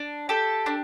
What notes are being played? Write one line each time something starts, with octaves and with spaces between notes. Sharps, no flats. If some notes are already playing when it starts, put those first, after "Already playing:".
Already playing: D4
G4 A4
D4